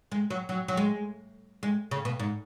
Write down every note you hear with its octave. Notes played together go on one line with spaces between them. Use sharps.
G#3
F#3
F#3
F#3
G#3
G#3
C#3
B2
G#2